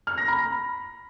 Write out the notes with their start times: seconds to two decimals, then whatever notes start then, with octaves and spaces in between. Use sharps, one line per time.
0.07 F6
0.18 A#6
0.28 B5